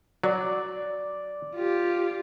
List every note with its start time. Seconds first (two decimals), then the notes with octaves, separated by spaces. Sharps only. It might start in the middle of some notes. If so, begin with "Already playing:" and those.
0.24 F#3 D5
1.55 F4 G4